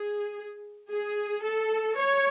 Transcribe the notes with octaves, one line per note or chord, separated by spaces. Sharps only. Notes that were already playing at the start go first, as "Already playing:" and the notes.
Already playing: G#4
G#4
A4
C#5